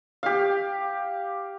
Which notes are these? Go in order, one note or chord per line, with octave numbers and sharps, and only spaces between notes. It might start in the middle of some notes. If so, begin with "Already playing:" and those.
G4 F5